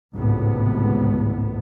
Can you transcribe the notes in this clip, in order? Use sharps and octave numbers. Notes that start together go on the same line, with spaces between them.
G#1 C#2 A2 C3 B3